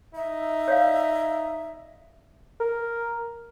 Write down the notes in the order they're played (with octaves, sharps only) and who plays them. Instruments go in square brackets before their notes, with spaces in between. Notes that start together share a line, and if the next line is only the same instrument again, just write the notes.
[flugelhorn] D#4 [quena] E5
[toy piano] C#5 D5 F5
[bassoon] A#4